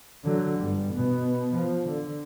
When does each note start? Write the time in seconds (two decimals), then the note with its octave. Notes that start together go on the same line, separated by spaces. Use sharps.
0.24 D3 F#3
0.58 G1 G3
0.94 B2 B3
1.54 F3
1.89 D3